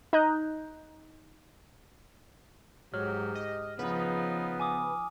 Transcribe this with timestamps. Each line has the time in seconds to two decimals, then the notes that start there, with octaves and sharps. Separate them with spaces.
0.13 D#4 D#5 A#5 F#6 G6
2.94 G#2 F#3 G4 F6
3.35 D#5
3.79 C#3 F3 B3 D#4 F4 B4
4.60 G#5 D6 D#6